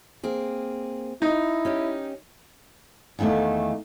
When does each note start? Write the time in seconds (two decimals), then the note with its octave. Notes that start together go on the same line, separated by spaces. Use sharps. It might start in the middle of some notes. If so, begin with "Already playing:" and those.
0.24 A#3 C4 G#4
1.22 D#4 E4
1.65 C#4 G4 D#5
3.19 E2 D3 D#3 A3 A#3